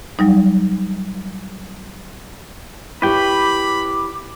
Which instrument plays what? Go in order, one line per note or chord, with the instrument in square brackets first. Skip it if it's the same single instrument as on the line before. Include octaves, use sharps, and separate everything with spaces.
[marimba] F#3 G3 D#4
[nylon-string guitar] E4 G4 C#5 [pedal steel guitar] B4 G5 [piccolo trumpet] B5 [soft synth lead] D6